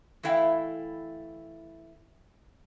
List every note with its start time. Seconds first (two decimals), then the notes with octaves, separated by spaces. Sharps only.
0.23 E3 A3 E4 F5 G5